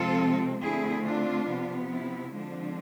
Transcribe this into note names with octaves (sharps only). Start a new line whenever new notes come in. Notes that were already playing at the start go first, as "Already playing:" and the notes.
Already playing: C3 F3 G#3 C4 F4 A4
D3 A3 C4 E4 G#4
D4 F4
C3 F3 B3
C4 E4
D3 F3 G#3 C4 D4